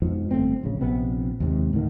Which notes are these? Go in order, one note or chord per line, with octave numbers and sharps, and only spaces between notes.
F2 G#2 B2 F3
G1 A3 C4
D1 A#1 C#3
A#1 C3 B3 C4
D#2 G#2 C3
D2 A2 D#3